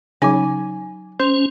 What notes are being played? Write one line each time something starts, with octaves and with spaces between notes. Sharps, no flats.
C#3 F#3 D#4 G#5
C#4 C5